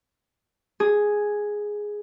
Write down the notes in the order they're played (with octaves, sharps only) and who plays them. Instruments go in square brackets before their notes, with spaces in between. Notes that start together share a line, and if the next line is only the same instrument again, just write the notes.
[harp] G#4